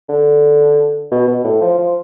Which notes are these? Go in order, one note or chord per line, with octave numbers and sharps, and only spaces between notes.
D3
B2
B2
A2
F3
F3